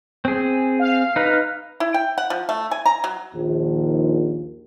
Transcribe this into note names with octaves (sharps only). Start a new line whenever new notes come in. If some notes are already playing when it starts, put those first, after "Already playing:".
C4 G#4
F5
D#4 B4 A#5
E4
G5
F#5
F3
A3
G#5
A#5
F#3
A#1 D#2